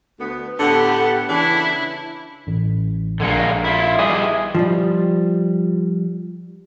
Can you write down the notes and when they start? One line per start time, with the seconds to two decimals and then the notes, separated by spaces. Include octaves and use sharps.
0.20 D2 B3
0.59 A2 D3 B3 G4 A4 F#5
1.29 C#3 E3 D4 E4
2.47 A1
3.20 A#1 D3 G#3 A#3 G#6 C#7
3.64 E4 F4
3.99 G3 E4 G#4 D#5 D6 D#6
4.55 F3 G3